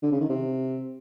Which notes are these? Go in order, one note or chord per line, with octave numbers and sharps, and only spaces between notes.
D3
C#3
D#3
C3